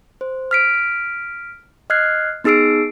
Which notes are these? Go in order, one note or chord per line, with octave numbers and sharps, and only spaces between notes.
C5
F6 B6 D7
D#5 F6 F#6 G#6 C7
B3 D#4 G#4 E6 C7 D7